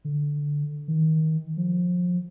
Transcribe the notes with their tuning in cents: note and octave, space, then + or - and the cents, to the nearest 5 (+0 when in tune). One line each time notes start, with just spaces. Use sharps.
D3 -5
D#3 +25
F3 +30